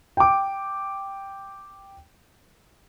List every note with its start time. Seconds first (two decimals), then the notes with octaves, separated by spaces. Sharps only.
0.17 G5 D6